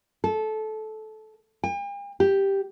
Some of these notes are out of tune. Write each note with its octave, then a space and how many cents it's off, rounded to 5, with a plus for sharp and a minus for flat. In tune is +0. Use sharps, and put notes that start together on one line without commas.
A4 -20
G5 +45
G4 +0